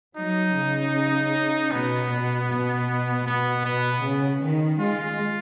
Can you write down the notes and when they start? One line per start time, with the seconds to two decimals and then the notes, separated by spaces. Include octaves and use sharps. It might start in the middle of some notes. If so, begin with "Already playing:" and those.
0.17 F#3 D#4
0.56 C#3
1.72 B2 B3
2.10 B2
2.50 B2
3.26 B2 B3
3.65 B2 B3
4.03 C#3
4.42 D#3
4.80 G#3 F4